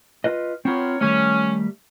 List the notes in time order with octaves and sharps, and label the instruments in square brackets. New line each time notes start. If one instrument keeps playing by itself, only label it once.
[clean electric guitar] F4 B4 D#5
[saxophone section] B3 A#4 C#5 [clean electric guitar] C4 F4
[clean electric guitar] D#3 G3 A3 [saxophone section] C#4